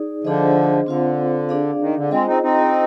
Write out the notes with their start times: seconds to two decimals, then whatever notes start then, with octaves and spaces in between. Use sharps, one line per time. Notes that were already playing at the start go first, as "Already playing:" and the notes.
Already playing: D#4 G#4 D5
0.24 D3 F3 D4 G#4 C5 D#5
0.86 D3 C4 F4 C5 F5
1.49 D4 G#4 D5 F5
1.81 D#3
1.96 D3
2.11 G#3 C4 F4 G#4 C5 D#5
2.27 C4 D#4
2.42 C4 D#4